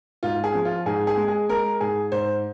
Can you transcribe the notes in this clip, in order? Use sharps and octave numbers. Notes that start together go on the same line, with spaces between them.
G#2 F4
G#4
F3
F4
G#2 G#4
G#4
G#3
G#4
G#3 A#4
G#2 G#4
G#2 C5